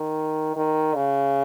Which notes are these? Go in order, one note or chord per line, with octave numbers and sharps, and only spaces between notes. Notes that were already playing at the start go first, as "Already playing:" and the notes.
Already playing: D#3
D#3
C#3